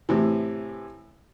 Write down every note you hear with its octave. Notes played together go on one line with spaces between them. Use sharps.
A2 C3 E3